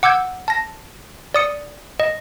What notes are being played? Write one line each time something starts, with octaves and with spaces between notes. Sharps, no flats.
F#5 D6 E6 G6 G#6
A5 A#6
D5 D#6 C#7
D#5